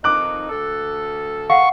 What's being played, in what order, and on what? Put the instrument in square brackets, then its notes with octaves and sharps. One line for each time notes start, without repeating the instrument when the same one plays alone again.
[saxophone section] F2 D#3 D#4 [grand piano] D6 F#6
[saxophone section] D2 A4
[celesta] F5 F#5 C7 [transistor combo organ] C#6